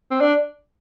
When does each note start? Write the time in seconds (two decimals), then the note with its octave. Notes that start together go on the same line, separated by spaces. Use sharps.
0.11 C4
0.21 D4